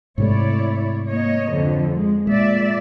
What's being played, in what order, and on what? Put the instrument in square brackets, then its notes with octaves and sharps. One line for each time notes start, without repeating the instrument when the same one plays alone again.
[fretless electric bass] G#2 C3 A3 [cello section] E4 C#5 D5
[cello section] A#3 C#5 D#5
F2 D3
G#3
[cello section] A#2 D5 E5 [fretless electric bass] G#3